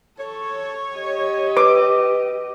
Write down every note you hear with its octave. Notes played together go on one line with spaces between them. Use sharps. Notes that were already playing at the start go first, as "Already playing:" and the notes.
A4 C#5
G4 D#5
B4 D6